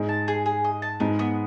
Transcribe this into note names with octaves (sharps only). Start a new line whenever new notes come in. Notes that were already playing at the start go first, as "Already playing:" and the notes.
Already playing: G#2 G#3
A5
G#4
G#4
D#5
A5
G#2 G#3 B3
B3